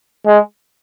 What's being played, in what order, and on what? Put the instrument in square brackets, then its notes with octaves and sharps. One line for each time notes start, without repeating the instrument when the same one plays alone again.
[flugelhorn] G#3